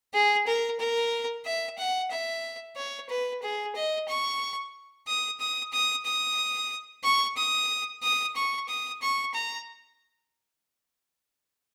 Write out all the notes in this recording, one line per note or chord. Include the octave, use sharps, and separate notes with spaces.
G#4
A#4
A#4
E5
F#5
E5
C#5
B4
G#4
D#5
C#6
D#6
D#6
D#6
D#6
C#6
D#6
D#6
C#6
D#6
C#6
A#5